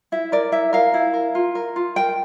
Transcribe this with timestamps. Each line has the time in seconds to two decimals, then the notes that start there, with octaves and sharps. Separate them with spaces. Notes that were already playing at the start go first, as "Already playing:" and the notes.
0.12 E4 E5
0.32 A#4 D5
0.52 E4 E5
0.73 A#4 F5
0.94 E4
1.14 A#4
1.35 F4
1.55 A#4
1.76 F4
1.96 A#4 G5